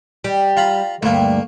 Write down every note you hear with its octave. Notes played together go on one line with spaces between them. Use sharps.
G3 D6
F4 A#5 B5
D2 G2 A3 A#3